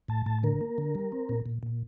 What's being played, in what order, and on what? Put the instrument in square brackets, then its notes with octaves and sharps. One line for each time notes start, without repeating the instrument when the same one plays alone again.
[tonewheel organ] A2 A5
A2 A5
D3 A#4
A#3
D3
G3
C4
A#2
A#2
A#2